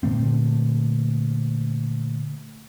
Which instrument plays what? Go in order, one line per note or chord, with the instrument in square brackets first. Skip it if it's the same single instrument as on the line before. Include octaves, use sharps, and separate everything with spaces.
[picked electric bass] A#2 D3 A3 C4